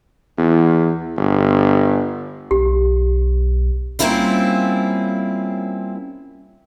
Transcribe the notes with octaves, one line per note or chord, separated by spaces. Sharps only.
E2
G1
B1 G4
G3 A#3 C4 C#4 E4 F4